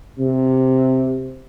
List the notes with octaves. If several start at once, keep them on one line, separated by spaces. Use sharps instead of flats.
C3